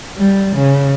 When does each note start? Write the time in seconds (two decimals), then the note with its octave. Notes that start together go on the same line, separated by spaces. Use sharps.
0.16 G3
0.55 C#3